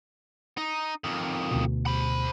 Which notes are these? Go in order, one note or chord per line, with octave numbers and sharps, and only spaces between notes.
D#4
F2 D#3
D2 B2
C5 B5